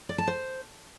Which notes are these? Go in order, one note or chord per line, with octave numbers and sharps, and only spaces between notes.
D5
A5
C5